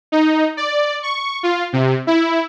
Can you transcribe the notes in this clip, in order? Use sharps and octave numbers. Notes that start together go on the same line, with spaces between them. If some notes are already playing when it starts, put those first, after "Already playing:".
D#4
D5
C#6
F4
C3
E4